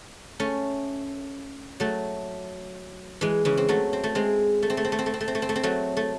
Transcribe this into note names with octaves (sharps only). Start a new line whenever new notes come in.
A3 C#4
F#3 A3
E3 G#3
C#3 E3
C4
F#3 A3
C4
A3
G#3 C4
A3
C4
A3
C4
A3
C4
A3
C4
A3
C4
A3
C4
A3
C4
F#3 A3
A3